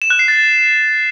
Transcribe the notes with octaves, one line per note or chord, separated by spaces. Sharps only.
E7
F#6
C7
A6